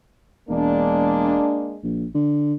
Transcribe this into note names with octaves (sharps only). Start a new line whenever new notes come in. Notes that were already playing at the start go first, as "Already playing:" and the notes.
E1 G#3 A#3 D4
A#1
D3